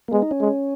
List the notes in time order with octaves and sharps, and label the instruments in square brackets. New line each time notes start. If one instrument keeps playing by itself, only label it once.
[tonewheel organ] A#3
[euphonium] G#3 [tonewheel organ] B3
[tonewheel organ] D#4
C#4
[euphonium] G#3